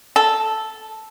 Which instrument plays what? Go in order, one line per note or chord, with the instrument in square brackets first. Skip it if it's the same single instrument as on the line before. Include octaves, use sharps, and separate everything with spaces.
[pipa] A4